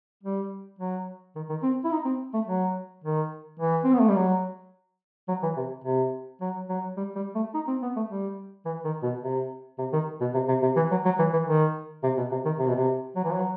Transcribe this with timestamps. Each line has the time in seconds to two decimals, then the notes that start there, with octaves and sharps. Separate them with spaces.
0.23 G3
0.79 F#3
1.35 D#3
1.49 D#3
1.63 C4
1.84 E4
1.91 D#4
2.05 C4
2.33 A3
2.47 F#3
3.04 D#3
3.59 E3
3.84 C4
3.93 B3
4.00 A3
4.08 G3
4.15 F#3
5.28 F#3
5.42 E3
5.57 C3
5.84 C3
6.41 F#3
6.69 F#3
6.97 G3
7.15 G3
7.35 A3
7.54 D#4
7.67 C4
7.82 B3
7.96 A3
8.09 G3
8.65 E3
8.85 D#3
9.03 B2
9.22 C3
9.78 C3
9.93 D#3
10.20 B2
10.34 C3
10.48 C3
10.62 C3
10.76 E3
10.91 F#3
11.05 F#3
11.19 E3
11.33 E3
11.47 D#3
12.03 C3
12.17 B2
12.32 C3
12.45 D#3
12.58 C3
12.68 B2
12.76 C3
13.16 F#3
13.24 E3
13.33 F#3